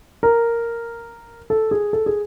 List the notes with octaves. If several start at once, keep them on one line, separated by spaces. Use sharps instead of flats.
A#4
A4
G#4
A4
G#4